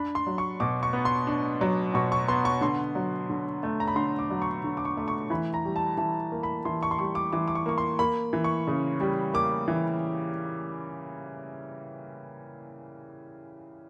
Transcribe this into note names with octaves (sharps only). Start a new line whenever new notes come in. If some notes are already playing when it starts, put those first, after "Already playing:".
Already playing: D4 B5
C6
F#3
C#6
B2 D6
C#6
B3
C6
D4
F#3
B2 C#6
C#6
B3 C6
C#6
D3 C6
F#3
D3
A3
A#5
B5
D3 C6
D6
F#3
C#6
D3
D6
C#6
A3 D6
C#6
E3 B5
A#5
G3
A5
E3 A5
A#3
B5
E3 C6
C#6
C6
G3 C#6
D6
E3 D6
D6
C#6
A#3 C#6
C6
A#3 B5
E3
C#6
C#3
G3
A#3 D6
E3